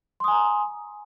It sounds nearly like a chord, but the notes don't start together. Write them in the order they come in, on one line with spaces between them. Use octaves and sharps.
C6 D#6 G#5 A#5